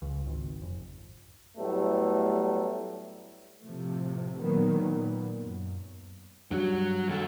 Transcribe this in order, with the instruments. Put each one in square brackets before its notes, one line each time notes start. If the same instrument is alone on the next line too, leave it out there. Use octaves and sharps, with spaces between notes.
[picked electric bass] C#2
G#1
F1
[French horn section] A2 F#3 G3 A3 B3
[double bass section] A2 C3 F3 A3
A#2 D#3 F#3 B3
A#2 B3
F#2
[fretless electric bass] G2 [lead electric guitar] F#3 F#4
[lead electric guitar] D#2 A4